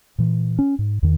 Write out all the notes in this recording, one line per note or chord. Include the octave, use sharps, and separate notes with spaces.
A#2 E3
C#4
G#2
E2 D#3